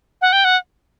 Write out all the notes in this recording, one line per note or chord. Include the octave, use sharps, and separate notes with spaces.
F#5
G5
F#5